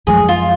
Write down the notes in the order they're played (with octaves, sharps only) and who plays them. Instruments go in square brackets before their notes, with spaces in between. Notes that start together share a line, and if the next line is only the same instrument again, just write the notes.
[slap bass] F#2 F3 G#3 [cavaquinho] G#4
[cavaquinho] F4